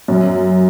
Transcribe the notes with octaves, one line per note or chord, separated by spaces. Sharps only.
F#2